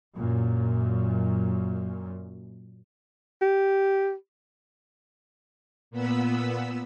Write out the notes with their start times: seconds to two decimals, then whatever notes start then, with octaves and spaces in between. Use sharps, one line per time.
0.16 F#2 A#2
3.41 G4
5.91 A#2 B3 B5 E6